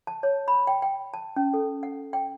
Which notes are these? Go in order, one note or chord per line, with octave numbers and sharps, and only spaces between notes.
A5
C#5
B5
G5
G5
A5
C#4
A4
F#5
G5